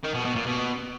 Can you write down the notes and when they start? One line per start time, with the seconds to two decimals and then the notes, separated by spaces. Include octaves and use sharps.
0.03 D#3
0.14 B2
0.25 B2
0.36 A#2
0.46 B2